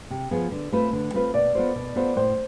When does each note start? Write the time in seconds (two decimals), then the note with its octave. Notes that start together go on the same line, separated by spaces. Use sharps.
0.10 C3
0.31 F3 B3 F4 G#4
0.52 D3
0.72 A3 C4 F4 B4
0.93 D3
1.14 A3 C4 F4 B4
1.34 B2 D5
1.55 B3 F4 A4 C5
1.75 B2
1.96 B3 F4 A4 C5
2.16 A2 C5